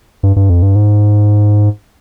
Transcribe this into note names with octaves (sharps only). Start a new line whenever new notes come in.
G2
G2
F2
G2
G#2